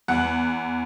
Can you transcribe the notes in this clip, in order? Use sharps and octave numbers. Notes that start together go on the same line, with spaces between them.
E2 F#5 F#6